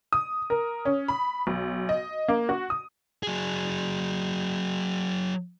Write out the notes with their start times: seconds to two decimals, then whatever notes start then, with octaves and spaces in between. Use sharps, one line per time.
0.13 D#6
0.50 A#4
0.85 C#4
1.08 B5
1.47 B1
1.89 D#5
2.28 A#3
2.49 F#4
2.70 D#6
3.23 F#3 G#4